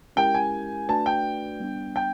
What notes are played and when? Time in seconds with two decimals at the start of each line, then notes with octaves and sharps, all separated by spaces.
0.16 G#3 C#4 E4 G4 A#4 G5
0.34 G#5
0.89 A3 D4 F#4 B4 D5 A5
1.06 G5
1.60 G3 B3 D4
1.96 G5